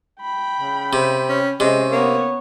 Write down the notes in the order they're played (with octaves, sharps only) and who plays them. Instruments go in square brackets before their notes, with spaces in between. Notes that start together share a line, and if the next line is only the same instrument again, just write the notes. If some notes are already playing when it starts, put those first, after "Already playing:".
[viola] G5 B5
[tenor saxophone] C#3
[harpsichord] C3
[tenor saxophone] C#4
[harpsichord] C3 [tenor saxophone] G#3 [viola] C#4
[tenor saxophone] A#3 [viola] B3 C#5